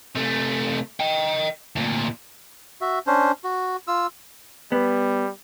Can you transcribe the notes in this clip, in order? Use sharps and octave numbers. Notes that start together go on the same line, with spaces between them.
C3 A3
D#5 G5
D2 A#2
F#4 E5
C#4 D4 C5
F#4
F4 E6
G3 B3